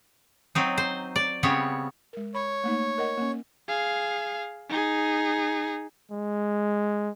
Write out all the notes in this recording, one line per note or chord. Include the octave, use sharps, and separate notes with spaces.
F#3 C4 D#4
C5
D5
C#3 G3 B3 C4 C#5
G#3 A#4
C#5 B5
A3 A#3 D#4
A#4 D#5 F#5
A#3 C#4
G#4 F5
D#4 G#4
G#3